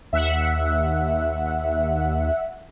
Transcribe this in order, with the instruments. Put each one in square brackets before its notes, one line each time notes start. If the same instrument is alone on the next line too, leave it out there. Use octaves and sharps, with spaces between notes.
[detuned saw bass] D#2 [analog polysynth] E5 F#5